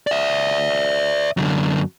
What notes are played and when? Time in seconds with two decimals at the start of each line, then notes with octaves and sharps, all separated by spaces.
0.07 D5 E5
1.37 F#2 D3